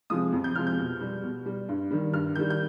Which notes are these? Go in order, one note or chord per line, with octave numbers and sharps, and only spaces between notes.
C3 F3 G#3 D#6
F2
G6
C3 F3 G#3 F6
G6
B2
G3
B2
G3
G2
D#3 G3
G2 F6
D#3 G3 G6
G6